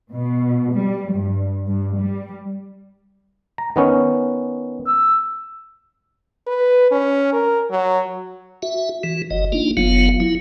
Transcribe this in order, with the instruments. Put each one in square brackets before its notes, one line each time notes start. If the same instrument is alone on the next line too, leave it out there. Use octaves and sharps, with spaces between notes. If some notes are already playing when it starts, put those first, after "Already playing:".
[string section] B2
G3
G2
G2
G3
[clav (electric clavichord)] A#5
D#3 B3 C#4
[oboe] E6
[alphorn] B4
C#4
A#4
F#3
[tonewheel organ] F#4 E5
E3 F#4
F#1 D#5
A#3 D4 D#4 F4
F#1 F#3 B3 F4 F5
F#3 E4